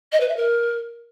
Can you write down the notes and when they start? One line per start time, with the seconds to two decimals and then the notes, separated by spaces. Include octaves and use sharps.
0.12 D#5
0.20 B4
0.28 E5
0.36 A#4